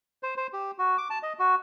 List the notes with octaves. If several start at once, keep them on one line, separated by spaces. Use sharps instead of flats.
C5
C5
G4
F#4
D6
A5
D#5
F#4